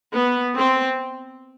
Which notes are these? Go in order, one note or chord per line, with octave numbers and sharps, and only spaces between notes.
B3
C4